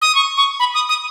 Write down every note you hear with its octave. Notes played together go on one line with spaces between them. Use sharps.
D#6
C#6
C#6
B5
D#6
D#6